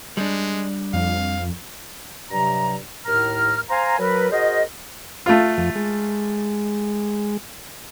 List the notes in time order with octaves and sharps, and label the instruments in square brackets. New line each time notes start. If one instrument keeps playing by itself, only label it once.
[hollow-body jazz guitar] G3 D4 [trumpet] G#3
[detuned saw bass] F2 [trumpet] F5
[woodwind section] G2 C3 F#3 A#5
D#2 A2 A#4 A#5 F6
C5 F5 G#5 A#5
F#3 A#4 B4
F#4 G#4 A#4 C5 D#5
[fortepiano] A3 F4
[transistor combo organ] F2 F3
G#3